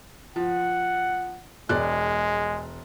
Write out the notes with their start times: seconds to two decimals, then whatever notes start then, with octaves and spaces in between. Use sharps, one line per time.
0.36 F3 F#5
1.69 E1 G#3 D5 F#6